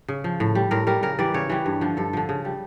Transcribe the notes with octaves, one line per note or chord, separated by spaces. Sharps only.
C#3
F3
A2
G3
A2 A#4
G3 A#4
C#3 A#4
E3 G3 D5
C#3 C#5
E3 G3
G2
D3 F3
G2 A4
D3 F3
C#3
G3